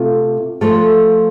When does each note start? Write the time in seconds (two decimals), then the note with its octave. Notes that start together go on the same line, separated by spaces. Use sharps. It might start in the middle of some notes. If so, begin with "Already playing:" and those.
Already playing: C3 A3 F4 A4
0.61 F3 A3 F4 A4